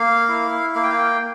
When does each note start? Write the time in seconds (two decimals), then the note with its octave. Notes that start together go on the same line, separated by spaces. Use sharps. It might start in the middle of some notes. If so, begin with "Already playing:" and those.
Already playing: A#3 F5
0.29 E4
0.75 A#3 F5
0.83 G5
0.90 F5
0.98 G5